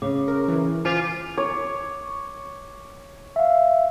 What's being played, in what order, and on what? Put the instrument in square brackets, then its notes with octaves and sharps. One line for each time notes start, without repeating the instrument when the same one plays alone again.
[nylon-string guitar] C#3 [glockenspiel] D6
[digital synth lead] A#4
E3
[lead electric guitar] F4 [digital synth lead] C5 [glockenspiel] G#5 D6 B6
[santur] C#5 [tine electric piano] D6
[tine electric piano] E5 F5